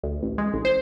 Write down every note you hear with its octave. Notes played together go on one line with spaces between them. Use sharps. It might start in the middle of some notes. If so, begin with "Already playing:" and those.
D2
A1
G#3
A1
C5